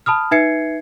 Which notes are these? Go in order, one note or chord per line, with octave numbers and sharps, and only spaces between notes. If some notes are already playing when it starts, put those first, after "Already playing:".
A5 B5 D#6 F6
D#4 B4 E5 G#6 C7 C#7